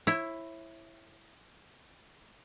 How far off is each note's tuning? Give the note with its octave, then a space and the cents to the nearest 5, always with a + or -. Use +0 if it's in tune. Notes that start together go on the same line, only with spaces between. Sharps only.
E4 +5 C#5 -35